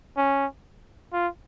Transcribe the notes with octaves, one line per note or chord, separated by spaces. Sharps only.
C#4
F4